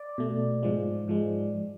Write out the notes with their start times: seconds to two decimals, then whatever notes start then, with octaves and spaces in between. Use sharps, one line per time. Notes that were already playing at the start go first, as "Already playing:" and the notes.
Already playing: D5
0.18 B2 A3
0.63 G#2 F3 G#3
1.08 G#2 F3 G#3